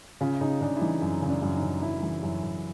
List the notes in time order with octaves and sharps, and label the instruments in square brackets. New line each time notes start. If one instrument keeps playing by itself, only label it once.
[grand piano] C#3 F4
C#3 D#4
C#3 D4
E4
E3 D#4
F#2
C#3
D4
F#2
D#4
C#3
F#2 E4
E3
F#2 E4
F#2